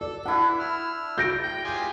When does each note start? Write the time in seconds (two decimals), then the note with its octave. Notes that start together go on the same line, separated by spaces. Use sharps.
0.01 A4 D5
0.26 E3 D4 E4 F#5
0.60 E6 F6
1.18 G6 A#6 D7
1.44 G5
1.64 F4 G4 G#4